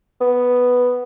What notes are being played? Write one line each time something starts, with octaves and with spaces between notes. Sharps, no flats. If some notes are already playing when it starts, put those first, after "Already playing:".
B3